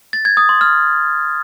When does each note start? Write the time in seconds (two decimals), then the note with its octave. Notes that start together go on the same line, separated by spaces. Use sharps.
0.13 A6
0.25 G#6
0.37 D#6
0.49 C6
0.61 F6